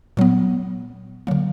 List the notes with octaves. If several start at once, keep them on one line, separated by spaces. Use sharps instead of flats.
A#2 F#3 B3
D3 F#3 A#3